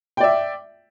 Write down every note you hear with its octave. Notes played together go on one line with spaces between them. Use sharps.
D5 E5 G5